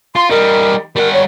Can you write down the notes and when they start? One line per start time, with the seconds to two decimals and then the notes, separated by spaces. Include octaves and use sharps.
0.15 F4 C6
0.31 G3 D#4 A#4
0.96 G3 A#4 F#5
1.13 C#5